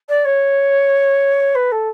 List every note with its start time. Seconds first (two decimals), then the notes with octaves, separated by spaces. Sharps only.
0.09 D5
0.25 C#5
1.55 B4
1.72 A4